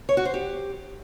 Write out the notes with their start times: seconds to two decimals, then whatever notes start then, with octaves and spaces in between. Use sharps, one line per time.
0.09 C#5
0.17 F#4
0.25 C5
0.34 G4